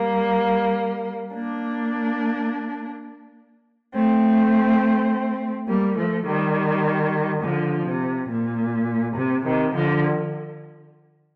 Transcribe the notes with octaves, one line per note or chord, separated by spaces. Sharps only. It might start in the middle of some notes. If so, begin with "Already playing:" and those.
Already playing: G3 A#3
A#3 D4
A3 C4
G3 A#3
F3 A3
D#3 G3
D3 F3
C3
A#2
C3
C3 D#3
D3 F3